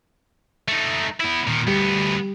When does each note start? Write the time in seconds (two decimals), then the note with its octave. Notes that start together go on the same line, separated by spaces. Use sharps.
0.68 A3 D#4
1.20 B3 E4
1.47 A#2 D#3
1.67 D2 G3 B3 G4